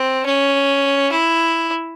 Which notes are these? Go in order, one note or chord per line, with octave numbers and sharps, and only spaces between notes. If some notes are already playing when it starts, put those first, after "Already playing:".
Already playing: C4
C#4
E4